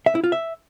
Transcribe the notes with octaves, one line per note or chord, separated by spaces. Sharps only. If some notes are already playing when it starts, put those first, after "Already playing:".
E5
E4
F4
E5